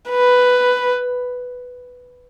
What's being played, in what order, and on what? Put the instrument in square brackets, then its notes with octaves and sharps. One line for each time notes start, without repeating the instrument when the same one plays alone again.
[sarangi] B4